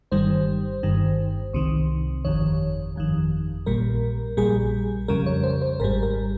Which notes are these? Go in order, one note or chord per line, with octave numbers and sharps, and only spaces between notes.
G1 G2 D#3 G3 C5
G1 G2 D#3
C2 C3 D#3
G1 F2 D#3 C#5
G1 F2 D#3
A#1 A#2 G3 A#4
A#1 A#2 G3 G#4
F2 C#3 G3 A#4
C#5
C5
C5
G#1 G#2 G3 A#4
A#4